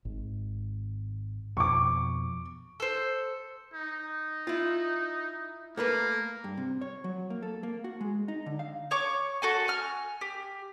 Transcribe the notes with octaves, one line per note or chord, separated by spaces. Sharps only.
G#1
F2 B2 C#6 D6
A4 C5
D#4
E4 F4
A3 A#3 A#4 B4
G2
C3
C#5
F#3
A#3
A4
A#3
F#4
G#3
D#4
D3
F5
C#5 C#6 D6
F#4 A4 G#5
G#5 F6
G4